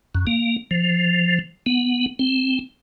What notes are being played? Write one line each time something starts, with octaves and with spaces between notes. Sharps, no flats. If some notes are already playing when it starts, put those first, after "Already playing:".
F#2
A#3
F3
B3
C4